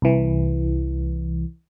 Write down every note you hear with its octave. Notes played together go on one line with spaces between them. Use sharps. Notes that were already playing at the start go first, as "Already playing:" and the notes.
C2 E3